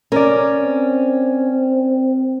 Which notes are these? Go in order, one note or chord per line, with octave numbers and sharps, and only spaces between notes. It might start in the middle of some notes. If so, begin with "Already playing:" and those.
C#4 A#4 D5
C4